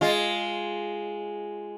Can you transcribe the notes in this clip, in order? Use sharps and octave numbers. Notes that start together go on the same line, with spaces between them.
G#3 F4